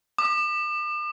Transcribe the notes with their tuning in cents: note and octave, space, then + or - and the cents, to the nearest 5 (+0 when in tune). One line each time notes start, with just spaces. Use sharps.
D6 +45